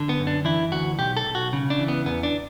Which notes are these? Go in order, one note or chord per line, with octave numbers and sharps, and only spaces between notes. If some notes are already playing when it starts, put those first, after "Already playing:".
Already playing: D3
B3
F#2
D4
E3 E4
D2 F#4
B1 G4
A4
B1
F#4
C#3
D4
E3
B3
E2 B3
D4